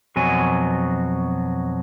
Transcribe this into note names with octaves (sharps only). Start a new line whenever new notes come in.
F2 B2 F#3 G#5